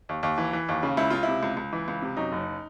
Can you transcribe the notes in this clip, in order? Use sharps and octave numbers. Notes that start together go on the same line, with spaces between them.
D#2
D#2
E3
E3
D#2
C#3
C#2 E4
C#2 F4
C3 E4
C#2
C#2
E3
C#2
C3
F#2 D#4
F#1